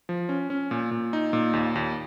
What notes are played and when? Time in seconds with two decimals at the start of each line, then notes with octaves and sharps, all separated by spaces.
0.09 F3
0.29 C#4
0.50 C#4
0.71 A#2
0.91 A#2
1.13 D#4
1.33 A#2
1.54 D#2
1.76 D#2